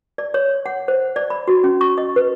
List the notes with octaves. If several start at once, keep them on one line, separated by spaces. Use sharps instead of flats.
D5
C#5
F#5
C5
D5
B5
F#4
C#4
C#6
D#5
B4